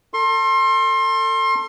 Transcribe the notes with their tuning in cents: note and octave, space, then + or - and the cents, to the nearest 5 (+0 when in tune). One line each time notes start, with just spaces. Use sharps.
A4 +35 C6 +30